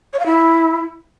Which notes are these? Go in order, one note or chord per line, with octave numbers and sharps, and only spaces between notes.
C#5
F5
E4